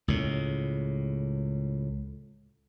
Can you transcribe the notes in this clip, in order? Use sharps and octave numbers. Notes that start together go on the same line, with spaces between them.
C#2 A2